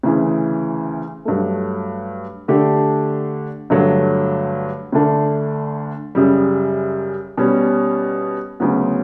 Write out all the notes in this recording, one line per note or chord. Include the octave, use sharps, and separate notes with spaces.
D2 C#3 E3
G2 F#3 A3
D3 A3 D4 G4
G2 D3 F#3 A3
D2 D3 A3 D4
F#2 C#3 G3
B2 G3 C#4
D2 C#3 F#3 B3